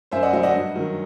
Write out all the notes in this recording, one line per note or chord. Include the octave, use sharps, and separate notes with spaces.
F#2 C5 E5
D#5 F#5
F#3 C5 E5
D#5 F#5
G2
D#3 F#3